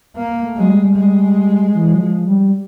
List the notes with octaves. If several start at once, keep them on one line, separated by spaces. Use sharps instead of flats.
A#3
A3
F#3 G#3
G3
G3 G#3
E3
F#3
F3
G3